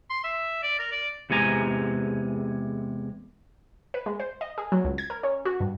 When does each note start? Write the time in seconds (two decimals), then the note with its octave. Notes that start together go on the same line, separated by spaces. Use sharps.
0.10 C6
0.24 E5
0.63 D5
0.79 A#4
0.92 D5
1.30 E2 C3 G#3 G#5 A#5
3.94 B4
4.06 G#3
4.20 C5
4.41 D#5
4.58 G#4
4.72 F#3
4.85 C#2
4.98 G#6
5.10 A#4
5.23 C#4
5.45 F#4
5.60 G2